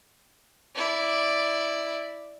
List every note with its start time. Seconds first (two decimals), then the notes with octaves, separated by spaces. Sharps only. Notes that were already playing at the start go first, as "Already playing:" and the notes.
0.76 E4 D5